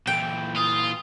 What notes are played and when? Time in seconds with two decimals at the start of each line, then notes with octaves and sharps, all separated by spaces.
0.07 A#2 E3 G5
0.56 F4 D#6